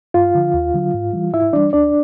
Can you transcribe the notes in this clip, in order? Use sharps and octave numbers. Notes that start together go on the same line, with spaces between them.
G2 F4 F5
D3 F3
D#2
D3 F#3
G#2
E3 G3
G#2 E4 E5
E3 G3 D4 D5
D2 D4 D5